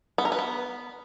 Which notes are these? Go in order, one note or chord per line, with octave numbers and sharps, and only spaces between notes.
B3
A#4
B4
B3